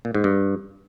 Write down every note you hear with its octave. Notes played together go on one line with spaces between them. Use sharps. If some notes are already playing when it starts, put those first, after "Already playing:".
A#2
G#2
G2